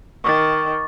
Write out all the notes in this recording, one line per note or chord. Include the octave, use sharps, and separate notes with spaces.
D#3 C#6 D6 A6